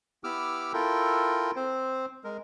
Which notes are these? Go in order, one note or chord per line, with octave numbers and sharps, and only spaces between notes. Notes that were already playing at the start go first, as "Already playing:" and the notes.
B3 E4 G4 D6 E6 F6
E4 F4 A4 A#4 G5
C4 C5
G#3 A#4